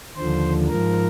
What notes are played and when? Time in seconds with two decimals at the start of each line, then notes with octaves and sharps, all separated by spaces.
0.16 D#2 D3 F3 C5
0.68 G#2 F3 A#4